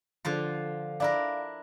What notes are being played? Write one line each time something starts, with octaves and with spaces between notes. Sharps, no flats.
D3 F3 F4
D4 E4 A#4 D5 F5